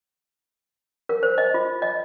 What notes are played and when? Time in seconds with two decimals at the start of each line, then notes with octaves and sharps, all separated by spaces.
1.09 A#4
1.23 C5
1.38 D#5
1.54 F4
1.82 D#5